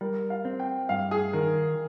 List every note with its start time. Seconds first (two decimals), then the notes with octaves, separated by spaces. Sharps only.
0.01 G3 A#4
0.30 F5
0.45 C4
0.60 G5
0.89 G2 F5
1.11 G#4
1.33 D#3 A#4